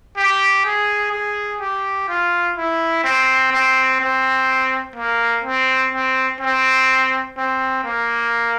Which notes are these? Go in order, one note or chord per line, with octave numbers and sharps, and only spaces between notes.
G4
G#4
G#4
G4
F4
E4
C4
C4
C4
A#3
C4
C4
C4
C4
A#3